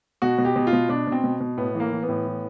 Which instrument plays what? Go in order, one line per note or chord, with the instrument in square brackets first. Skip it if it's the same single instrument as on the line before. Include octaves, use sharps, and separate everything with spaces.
[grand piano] B2 F#4
B2
G4
B2
F4
B2
B2 D4
B2 C4
B2
B2
A2 B3
E3
A#3
E3
B3
A2
E3